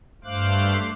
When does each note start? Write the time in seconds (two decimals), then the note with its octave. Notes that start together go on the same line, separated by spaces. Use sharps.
0.24 G2 A3 C5 F5 D6 F#6